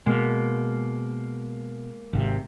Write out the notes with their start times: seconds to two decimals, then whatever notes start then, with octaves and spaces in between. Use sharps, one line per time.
0.06 B2 G#3 A#3
2.13 G#1 C3